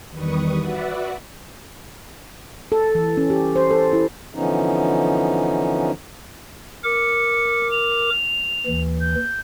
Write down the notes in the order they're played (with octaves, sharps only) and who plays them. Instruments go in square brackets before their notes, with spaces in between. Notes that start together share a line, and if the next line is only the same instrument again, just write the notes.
[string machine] E2 D#3 G3 B4 C#6 D#6
F#4 B4 D5 E5 F#5
[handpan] A4
E3
C#4
G4
C5
A4
E4
[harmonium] D3 E3 F3 B3 C#4 D#4
[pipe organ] A#4 D6 [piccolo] C#7
[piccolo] F7
[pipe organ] D#2 E3
[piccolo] G6